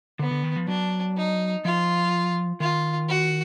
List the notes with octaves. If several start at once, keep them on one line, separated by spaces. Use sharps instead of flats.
D3 B3
D3
D#3
F3
F#3 D4
D#4
F3 F4
D#3 F4
F#4